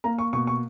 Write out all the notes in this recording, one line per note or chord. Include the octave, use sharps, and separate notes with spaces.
A#3 A#5
C#6
B2 C#6
C#6